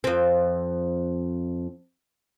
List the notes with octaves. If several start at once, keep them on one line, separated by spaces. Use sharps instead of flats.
F2 C4